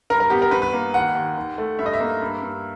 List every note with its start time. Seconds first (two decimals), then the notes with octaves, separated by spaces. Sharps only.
0.10 G2 A#4
0.20 A#4
0.30 B3 G4
0.42 A#4
0.51 G2 B4
0.62 B4
0.73 A#3
0.94 D#2 F#5
1.15 D#2
1.37 D#2
1.58 A3
1.79 G2 E5
1.86 D#5
1.93 E5
2.01 A#3
2.22 G2
2.42 G2